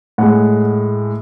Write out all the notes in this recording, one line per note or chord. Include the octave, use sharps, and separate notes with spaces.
A2 G#3 F#5